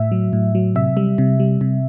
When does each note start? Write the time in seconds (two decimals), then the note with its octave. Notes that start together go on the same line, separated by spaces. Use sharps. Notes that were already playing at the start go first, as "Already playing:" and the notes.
Already playing: A2 E5
0.12 F#3
0.33 A2
0.55 F#3
0.75 C3 E5
0.97 G3
1.18 C3
1.40 G3
1.61 C3